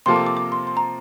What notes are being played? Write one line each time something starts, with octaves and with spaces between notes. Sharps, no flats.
C3 F3 A#3 F4 A4 C6
D6
D6
D6
C6
C6
A#5